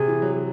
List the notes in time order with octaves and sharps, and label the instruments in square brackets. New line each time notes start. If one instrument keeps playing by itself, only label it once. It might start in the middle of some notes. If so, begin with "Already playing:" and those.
Already playing: [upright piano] C3 [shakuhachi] G#4
[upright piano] E3
F#3